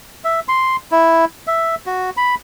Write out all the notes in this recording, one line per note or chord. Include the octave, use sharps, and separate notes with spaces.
E5
C6
E4
E5
F#4
B5